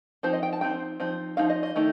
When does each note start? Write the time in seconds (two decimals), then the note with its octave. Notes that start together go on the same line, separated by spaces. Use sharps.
0.23 F3 C4 D#4 C5
0.33 D#5
0.43 G5
0.53 A5
0.61 F3 C4 D#4 G5
1.00 F3 C4 D#4
1.37 F3 C4 D#4 F5
1.50 D#5
1.63 D#5
1.76 D#3 A3 D#4